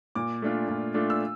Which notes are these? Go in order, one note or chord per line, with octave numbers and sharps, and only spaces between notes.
A#2 D6
A3 D4 F4
A#2
A3 D4 F4
E6